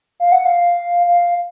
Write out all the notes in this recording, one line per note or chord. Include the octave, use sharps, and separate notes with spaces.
F5
F#5
F5
F5